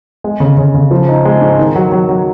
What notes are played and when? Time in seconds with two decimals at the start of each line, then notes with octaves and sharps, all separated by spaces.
0.24 G#3
0.40 C#3
0.57 C#3
0.74 C#3
0.91 F3
1.09 D#4
1.25 G#3
1.42 G#2
1.59 D#3
1.76 F#3
1.92 F#3
2.09 F#3